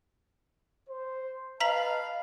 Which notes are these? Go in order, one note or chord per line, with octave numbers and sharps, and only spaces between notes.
C5
B4 D#5 F5 A5 A#5 B6 F#7